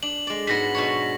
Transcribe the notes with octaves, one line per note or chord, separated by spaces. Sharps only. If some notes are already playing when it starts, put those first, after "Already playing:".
D4 F#7
G#3 D5
G#2 F#3 B3 A#6 B6
B2 D4 C#5